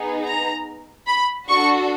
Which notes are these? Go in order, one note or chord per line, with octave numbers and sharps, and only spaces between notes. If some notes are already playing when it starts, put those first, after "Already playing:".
Already playing: B3 D#4 G#4
A#5
B5
D4 F#4 A4 C#6